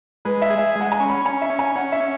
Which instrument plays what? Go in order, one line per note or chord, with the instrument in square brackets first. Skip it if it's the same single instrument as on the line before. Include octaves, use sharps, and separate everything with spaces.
[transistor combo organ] G#3 [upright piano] B4
[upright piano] E5
[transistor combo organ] G#4
[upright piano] E5
[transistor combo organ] G#3
[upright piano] F#5
G#5
[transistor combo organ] C#4
[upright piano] B5
[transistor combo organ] C#4 [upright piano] G#5
[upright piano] E5
[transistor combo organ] C#4
[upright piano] G#5
[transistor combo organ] C#4 [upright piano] F#5
[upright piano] E5
[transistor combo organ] C#4